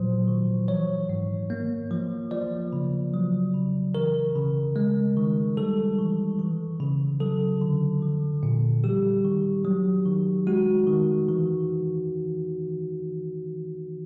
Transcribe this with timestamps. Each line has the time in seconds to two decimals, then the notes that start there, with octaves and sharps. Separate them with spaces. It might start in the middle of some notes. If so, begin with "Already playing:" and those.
Already playing: A#2 F3 F#3 C5
0.28 D#3
0.68 E3 C#5
1.09 G#2
1.50 A#3
1.91 F3
2.31 F3 D5
2.73 C#3
3.14 F#3
3.54 C#3
3.95 E3 A#4
4.35 C#3
4.76 G#3
5.17 D#3
5.57 G3 A4
5.98 E3
6.39 E3
6.80 C#3
7.20 F#3 A4
7.61 D3
8.02 F3
8.43 A#2
8.84 G3 G4
9.25 D#3
9.65 F#3
10.06 D#3
10.47 G#3 F#4
10.87 D#3
11.29 E3